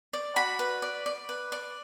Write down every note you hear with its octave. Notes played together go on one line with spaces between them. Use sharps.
D5
F#4 B5
B4
D5
D5
B4
D5